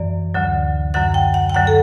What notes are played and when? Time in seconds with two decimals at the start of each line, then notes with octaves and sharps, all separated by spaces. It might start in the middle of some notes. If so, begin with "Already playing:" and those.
Already playing: F#2 E3 D5
0.34 D2 D3 F#3
0.94 F#2 D3 F#3 F#5
1.14 G5
1.34 F#5
1.50 G5
1.54 F#2 D3 F#3 F#5
1.67 A4